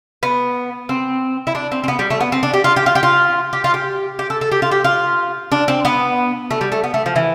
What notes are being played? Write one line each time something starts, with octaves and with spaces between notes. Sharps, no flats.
B3
C4
E4
D4
C4
C4
B3
G3
A3
B3
C4
D4
G4
F4
G4
F4
G4
F4
G4
F4
G4
G4
A4
A4
G4
F4
G4
F4
D4
C4
B3
A3
G3
A3
B3
A3
F3
E3